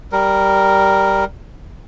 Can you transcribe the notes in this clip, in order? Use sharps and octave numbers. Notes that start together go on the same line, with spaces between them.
G3 A#4